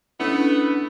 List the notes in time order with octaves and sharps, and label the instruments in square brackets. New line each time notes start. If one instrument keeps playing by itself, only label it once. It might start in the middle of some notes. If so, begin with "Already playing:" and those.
[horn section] A3 B3 [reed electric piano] C#4 D4 E4